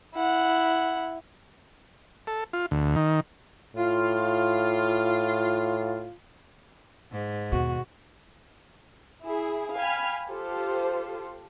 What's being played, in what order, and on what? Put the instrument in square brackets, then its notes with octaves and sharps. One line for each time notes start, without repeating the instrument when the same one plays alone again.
[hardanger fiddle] E4 F#5
[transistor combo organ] A4
F4
D2
D#3
[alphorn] A2 [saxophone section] F4
[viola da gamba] G#2
[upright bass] D#2 B2 [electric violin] F#4
[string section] E4 G#4
F5 G5 G#5 B5 F6
F4 G4 A4 C5